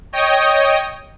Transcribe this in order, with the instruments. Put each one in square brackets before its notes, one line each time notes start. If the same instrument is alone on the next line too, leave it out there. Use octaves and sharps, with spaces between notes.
[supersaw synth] C#5 D#5 G5 D#6